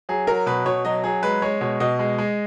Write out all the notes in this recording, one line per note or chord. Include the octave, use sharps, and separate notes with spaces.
F#3 G#4
F#3 A#4
B2 B4
B2 C#5
F#3 D#5
F#3 G#4
G#3 B4
G#3 C#5
B2 C#5
B2 D#5
G#3
G#3